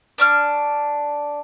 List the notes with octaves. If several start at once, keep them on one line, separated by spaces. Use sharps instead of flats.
D4 C#6 F6